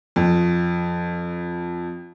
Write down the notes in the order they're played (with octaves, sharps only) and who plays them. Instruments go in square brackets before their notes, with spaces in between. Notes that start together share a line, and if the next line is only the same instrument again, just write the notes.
[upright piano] F2